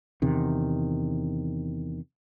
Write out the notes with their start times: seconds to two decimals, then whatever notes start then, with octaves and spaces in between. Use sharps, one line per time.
0.22 E2 C3 D#3